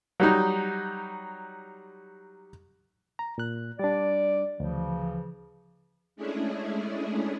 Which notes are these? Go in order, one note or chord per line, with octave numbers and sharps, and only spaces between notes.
F#3 G3 D#4
A#5
A#2 F#6
G3 D4 D5
D2 C#3 E3 F3
G#3 A3 C#4 D4 E4 G#4